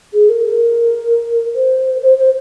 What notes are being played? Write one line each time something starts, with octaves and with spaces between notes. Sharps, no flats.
G#4
A#4
A#4
C5
C5
C5